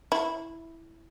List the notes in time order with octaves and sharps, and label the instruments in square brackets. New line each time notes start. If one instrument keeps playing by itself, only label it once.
[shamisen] E4